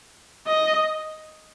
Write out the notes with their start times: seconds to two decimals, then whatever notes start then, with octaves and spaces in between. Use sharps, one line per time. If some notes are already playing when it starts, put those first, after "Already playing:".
0.47 D#5